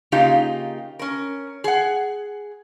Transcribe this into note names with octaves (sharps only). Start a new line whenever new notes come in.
C#3 A#3 D#4 F4 G4
C#4 A#4
G#4 F#5